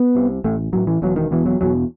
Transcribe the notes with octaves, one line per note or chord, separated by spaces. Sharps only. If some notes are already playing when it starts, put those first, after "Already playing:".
Already playing: B3
C2 C3
A1 A2 A3
A1 A2 F#3
E3
E1 E2 B2 F#3
D#3
E1 E2 B2 E3
F#3
E1 E2 B2 F#3